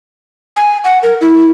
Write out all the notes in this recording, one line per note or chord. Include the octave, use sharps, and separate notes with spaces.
G#5
F#5
A#4
E4